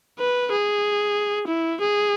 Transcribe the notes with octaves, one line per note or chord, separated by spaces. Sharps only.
B4
G#4
E4
G#4